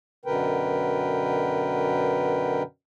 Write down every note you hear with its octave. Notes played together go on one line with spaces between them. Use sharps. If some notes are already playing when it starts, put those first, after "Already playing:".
F#2 B2 D3 A#4 B4 G5